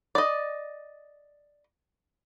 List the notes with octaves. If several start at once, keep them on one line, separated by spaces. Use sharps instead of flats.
D5 D#5